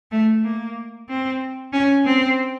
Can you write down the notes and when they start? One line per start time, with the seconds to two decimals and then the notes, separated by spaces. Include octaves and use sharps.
0.12 A3
0.44 A#3
1.09 C4
1.73 C#4
2.05 C4